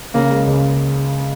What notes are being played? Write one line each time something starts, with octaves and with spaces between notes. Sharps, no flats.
C#3 A#3
G#3
C#2